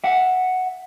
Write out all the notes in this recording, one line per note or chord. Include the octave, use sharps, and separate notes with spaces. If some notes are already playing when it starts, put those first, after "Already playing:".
E5 F#5